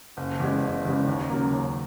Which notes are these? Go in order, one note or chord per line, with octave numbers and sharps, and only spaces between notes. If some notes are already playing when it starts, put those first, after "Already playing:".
F#1
E2 C#3 G#3
F#1
E2 C#3 G#3
D#2
C#3 F#3 A#3
D#2